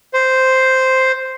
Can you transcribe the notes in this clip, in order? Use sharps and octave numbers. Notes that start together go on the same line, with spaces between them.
C5